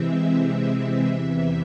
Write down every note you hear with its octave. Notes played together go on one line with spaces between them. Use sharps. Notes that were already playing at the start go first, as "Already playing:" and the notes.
Already playing: C3 E3 G#3 C4 E5
E2 C3 E3